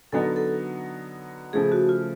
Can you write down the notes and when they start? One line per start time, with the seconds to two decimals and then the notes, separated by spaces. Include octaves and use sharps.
0.12 D3 F#3 B3 D#4 A4
0.36 A4
1.53 C#3 F3 A3 G#4
1.72 F#4
1.89 F4